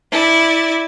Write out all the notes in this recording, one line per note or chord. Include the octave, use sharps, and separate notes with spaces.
E4 D5